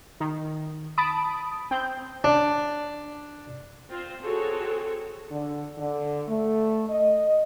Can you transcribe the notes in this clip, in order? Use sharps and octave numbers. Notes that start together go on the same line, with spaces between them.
D#3
A5 B5 D#6 D7
C4 G6
D4
C4 F4 C5
C4 F#4 G#4 A4 C#5
D3
D3
A3
D#5